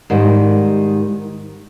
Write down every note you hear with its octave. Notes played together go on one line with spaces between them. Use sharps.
G#2 D#3 G3